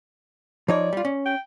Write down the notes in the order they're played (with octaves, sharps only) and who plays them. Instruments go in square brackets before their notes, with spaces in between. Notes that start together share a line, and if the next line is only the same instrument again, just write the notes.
[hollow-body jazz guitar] F3 D#4 C#5 [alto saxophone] D5
[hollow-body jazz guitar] G3 F4
C#4
[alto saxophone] G5